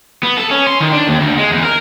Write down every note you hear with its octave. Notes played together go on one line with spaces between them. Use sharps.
B3
A4
C#4
C6
D#3
D4
D#2
D2
G#3
E2
A#4